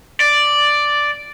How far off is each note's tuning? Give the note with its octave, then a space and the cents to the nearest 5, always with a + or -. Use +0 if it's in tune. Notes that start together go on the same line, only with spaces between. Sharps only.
D5 +0